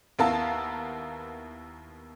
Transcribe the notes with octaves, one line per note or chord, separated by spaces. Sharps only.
D#2 B3 E4 A#4 F5 A5